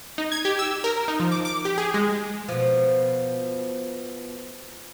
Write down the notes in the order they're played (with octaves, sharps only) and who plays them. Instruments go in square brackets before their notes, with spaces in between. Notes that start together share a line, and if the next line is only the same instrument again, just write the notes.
[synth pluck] D#4
G#6
G4
E6
A#4
D#4
F3
D6
D6
G4
G#4
G#3
[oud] B2 F3